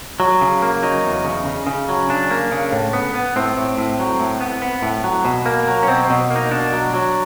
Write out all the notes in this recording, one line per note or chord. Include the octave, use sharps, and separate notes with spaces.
F#3
C#3
A#3
F#3 D#4
E2
C#3
C#3
C#3
F#3
C#3 D4
A#3
C#3
A2
B3
B3
A2 C4
A2
A2
F#3
A2
B3
B3
A2
F#3
B2
A#3
F#3
C#4
B2 C4
C4
B2
A#3
D#4
B2 D4
F#3
F#3